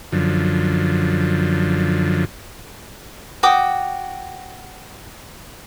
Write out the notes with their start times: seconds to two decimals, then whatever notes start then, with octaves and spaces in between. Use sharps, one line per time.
0.12 F#2 D3 F3
3.43 F#4 G5 D6 D#6